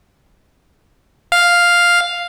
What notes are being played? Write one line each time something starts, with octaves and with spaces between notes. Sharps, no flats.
F5